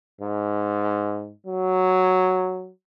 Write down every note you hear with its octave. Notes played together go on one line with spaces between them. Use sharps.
G#2
F#3